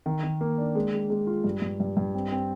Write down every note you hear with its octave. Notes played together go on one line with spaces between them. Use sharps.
D#3
D#3
A#3
D4
G#3
G#3
G#3
F4
G2
G2
G2
G2
C4
C4